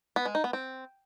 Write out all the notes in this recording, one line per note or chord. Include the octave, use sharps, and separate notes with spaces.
B3
G#3
D#4
B3
C4